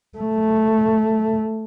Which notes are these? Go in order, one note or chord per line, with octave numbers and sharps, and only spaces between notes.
A3